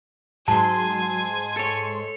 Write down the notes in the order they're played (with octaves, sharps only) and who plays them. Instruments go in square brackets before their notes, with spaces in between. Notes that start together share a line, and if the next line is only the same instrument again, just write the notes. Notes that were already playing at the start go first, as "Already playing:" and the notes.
[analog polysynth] G#2 C6 [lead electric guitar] F#3 [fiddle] G#5 [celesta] A5
[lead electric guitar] A4 C#5